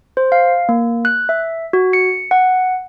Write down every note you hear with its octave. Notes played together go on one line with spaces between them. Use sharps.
C5
F5
A#3
F#6
E5
F#4
C#7
F#5